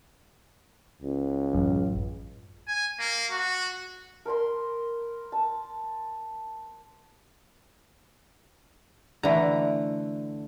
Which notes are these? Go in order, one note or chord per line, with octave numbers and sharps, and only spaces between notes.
C#2
A1 F#2
G#5
A#3
F#4
A#4 C5 B5 C6
A5
D3 E3 A3 A#5